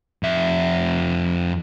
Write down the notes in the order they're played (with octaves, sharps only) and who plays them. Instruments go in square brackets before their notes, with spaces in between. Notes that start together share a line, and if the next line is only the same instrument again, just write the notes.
[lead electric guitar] F2 E5